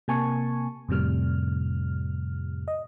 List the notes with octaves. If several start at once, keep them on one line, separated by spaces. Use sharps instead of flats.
C3 A#3 G#5 A5 C#6
F2 A2 C3 G3 F6
D#5